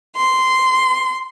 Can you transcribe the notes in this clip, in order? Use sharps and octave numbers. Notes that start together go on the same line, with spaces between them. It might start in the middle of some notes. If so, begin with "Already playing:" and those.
C6